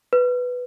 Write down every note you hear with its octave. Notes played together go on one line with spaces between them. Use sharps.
B4